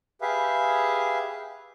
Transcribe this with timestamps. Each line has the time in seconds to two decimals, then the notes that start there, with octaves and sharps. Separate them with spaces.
0.21 G4 G#4 B4 E5 F5